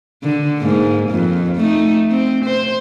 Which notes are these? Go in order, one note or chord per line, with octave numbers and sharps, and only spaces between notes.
D3
G#2 A#3
F2
A3 D#4
C4
C5